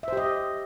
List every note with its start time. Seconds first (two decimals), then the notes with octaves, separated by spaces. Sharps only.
0.03 E5
0.08 C5
0.13 G4
0.17 D#5